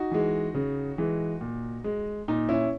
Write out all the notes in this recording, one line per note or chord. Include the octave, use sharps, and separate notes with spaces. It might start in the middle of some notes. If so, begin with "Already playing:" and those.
Already playing: D#4 F#4
E3 G#3
C#3
E3 G#3
A#2
G#3
A#2 D#4
C#4 E4